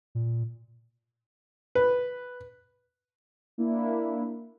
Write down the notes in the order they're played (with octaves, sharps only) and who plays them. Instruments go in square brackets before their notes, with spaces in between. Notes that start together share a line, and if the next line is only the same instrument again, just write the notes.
[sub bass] A#2
[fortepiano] B4
[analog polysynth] A#3 D4 E4